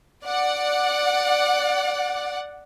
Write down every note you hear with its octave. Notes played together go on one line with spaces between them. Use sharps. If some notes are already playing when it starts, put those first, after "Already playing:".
D5 F#5